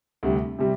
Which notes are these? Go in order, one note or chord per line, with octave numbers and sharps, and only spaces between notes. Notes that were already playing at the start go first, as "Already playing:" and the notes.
D2 C3 G3
C3 G3